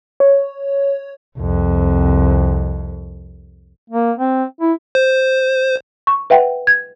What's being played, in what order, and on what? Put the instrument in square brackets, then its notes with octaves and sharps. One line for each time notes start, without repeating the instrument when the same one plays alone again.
[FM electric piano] C#5
[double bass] C2 F2
[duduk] A#3
C4
E4
[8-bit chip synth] C5
[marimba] C#6
B4 E5 F#5 G5
G#6